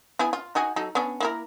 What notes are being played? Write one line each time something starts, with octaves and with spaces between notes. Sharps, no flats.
B3 E4 G#4
F4
D#4 F#4 G#4
F#3 D#4 A4
B3 C#4 D4
A#3 E4 A#4